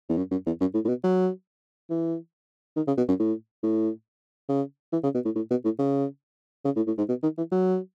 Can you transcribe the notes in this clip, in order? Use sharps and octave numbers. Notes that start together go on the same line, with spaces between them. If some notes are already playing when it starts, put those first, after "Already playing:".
E2
F#2
F#2
E2
F#2
A2
A2
B2
F#3
E3
D#3
C#3
B2
F#2
A2
A2
C#3
E3
C#3
B2
A2
A2
B2
A2
C#3
C#3
A2
A2
G#2
B2
D#3
E3
F#3